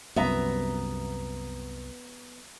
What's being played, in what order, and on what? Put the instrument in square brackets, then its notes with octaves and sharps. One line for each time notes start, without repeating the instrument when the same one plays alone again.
[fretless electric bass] C2 F#2 [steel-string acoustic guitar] B3 E5 A#5